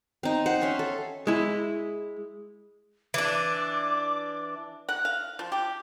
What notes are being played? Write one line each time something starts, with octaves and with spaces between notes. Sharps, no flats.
C4 D#4
C5 F#5
C#4 E5 C6
A4
G#3 E4
E3 D4 D6
F#5
F5
F3
G4